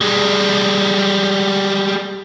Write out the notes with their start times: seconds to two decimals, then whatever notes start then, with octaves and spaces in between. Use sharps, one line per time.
0.01 G3 G#3